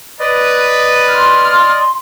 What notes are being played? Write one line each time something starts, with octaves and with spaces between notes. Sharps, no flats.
B4 D5 D#5
C6 F6